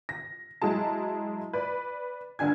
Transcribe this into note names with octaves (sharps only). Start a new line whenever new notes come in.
A#6
F#3 G#3 E4 G#4 A5
B4 D5
G2 D3 D4 G#5 G#6